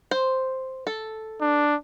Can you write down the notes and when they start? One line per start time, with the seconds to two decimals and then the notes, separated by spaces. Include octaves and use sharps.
0.11 C5
0.87 A4
1.41 D4